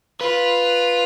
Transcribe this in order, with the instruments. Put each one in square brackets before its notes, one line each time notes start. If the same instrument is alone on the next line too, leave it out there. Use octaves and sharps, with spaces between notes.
[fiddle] F4 [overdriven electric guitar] B4